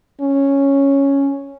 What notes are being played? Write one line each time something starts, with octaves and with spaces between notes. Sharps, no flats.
C#4